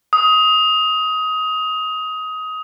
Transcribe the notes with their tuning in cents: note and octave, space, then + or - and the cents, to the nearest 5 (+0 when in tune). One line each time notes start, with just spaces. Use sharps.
D#6 +20